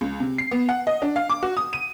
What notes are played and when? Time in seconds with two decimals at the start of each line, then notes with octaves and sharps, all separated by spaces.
0.01 C#2
0.20 C3
0.38 C7
0.51 B3
0.69 F#5
0.87 D#5
1.02 D4
1.16 F5
1.30 D6
1.43 F#4
1.57 D#6
1.73 D#7